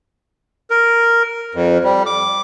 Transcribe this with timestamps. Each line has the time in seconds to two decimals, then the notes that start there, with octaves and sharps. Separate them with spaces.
0.70 A#4
1.55 F2
1.84 G3
2.06 D6